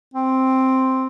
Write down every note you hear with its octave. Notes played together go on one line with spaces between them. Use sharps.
C4